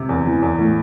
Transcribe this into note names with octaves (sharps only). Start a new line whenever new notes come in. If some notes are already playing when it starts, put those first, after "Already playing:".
Already playing: C3
E2
E3
E2
A2